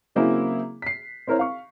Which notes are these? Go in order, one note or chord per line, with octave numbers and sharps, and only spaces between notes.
C#3 F#3 A#3 C4 E4 G#4
B6 C7
C4 E4 A#4 C5 C#5
F5 C#6